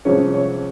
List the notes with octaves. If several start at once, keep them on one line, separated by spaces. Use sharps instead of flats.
C2 C3 F3 G#3 C#4 C#5
C#5